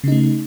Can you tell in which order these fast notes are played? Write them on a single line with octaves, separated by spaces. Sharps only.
C#3 D#4 A3